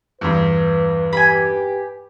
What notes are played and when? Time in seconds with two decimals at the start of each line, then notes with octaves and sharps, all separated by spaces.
0.21 E2 G2 B4
1.13 G4 G#5 B5